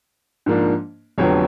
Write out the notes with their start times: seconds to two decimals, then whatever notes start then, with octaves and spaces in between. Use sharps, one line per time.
0.46 G#2 F3 A#3 D4
1.18 F1 F2 D3 F#3 B3 C#5